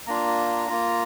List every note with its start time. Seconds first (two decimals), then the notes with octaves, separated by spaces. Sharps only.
0.07 A#3 D4 F4 A#5
0.69 A#3 F4